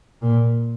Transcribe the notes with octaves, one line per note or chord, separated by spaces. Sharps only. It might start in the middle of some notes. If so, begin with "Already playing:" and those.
A#2